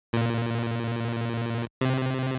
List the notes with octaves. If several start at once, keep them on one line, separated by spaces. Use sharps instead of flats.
A#2
C3